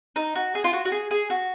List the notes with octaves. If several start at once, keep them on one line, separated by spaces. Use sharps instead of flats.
D#4
F#4
G#4
F4
F#4
F#4
G#4
G#4
F#4